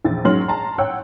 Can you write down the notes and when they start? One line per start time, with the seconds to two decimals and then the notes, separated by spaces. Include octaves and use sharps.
0.05 A#1 E2 A6
0.25 G#2 F#3 C#4 C6 F6 F#7
0.48 A5 A#5 C6
0.78 C#5 F#5 G5 E6 F#6